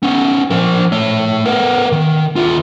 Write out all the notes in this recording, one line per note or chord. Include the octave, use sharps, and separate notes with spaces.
B3 C#4
F3 A#4
A3 C#5
B3 A#4
D#3
D#2 F4